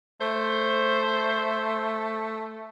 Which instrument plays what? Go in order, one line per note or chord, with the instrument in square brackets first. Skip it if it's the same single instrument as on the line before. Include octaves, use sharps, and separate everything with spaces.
[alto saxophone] A3 [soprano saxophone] C5